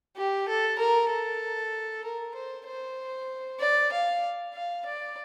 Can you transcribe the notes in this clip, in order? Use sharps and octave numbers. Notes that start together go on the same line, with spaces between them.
G4
A4
A#4
A4
A#4
C5
C5
D5
F5
F5
D5